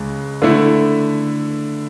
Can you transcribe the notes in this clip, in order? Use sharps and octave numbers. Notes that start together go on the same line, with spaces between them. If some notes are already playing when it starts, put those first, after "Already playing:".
Already playing: C#2 C#3 G#3
D3 A3 E4